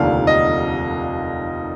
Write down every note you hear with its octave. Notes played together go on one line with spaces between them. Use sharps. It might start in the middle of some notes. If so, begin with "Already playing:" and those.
Already playing: F1 D#2 D3 F3 F5
D#5